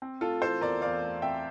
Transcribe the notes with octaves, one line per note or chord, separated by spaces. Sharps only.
C4
A3 F4 A4
E3 A4 C5
E2 A#4 D5
E2 D5 F5
A3
C4 E5 G5